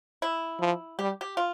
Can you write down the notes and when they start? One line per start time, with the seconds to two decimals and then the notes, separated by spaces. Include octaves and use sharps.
0.22 E4
0.60 F3
0.99 G3 G4
1.21 G4
1.37 F4